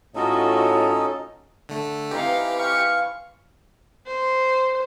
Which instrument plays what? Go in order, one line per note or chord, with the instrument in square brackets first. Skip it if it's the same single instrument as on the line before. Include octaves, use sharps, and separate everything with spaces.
[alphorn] A2 [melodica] C#4 D#4 A4 [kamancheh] F4 F#4 [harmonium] D#5
[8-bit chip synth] D3 A3
[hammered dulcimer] E3 C4 [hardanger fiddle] D#4 F5 [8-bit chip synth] G4
[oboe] F5 [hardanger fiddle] C#6
[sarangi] C5